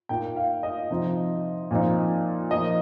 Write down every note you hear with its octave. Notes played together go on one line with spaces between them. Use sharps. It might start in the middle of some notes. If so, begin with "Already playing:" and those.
A#2 A#3 D#4 G5
F5
D#5
C3 F3 D#4
A#2 F3 C4 D#4
F3 A#3 D#4 D#5